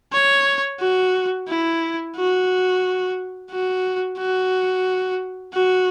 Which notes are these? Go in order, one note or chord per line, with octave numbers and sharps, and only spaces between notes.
C#5
F#4
E4
F#4
F#4
F#4
F#4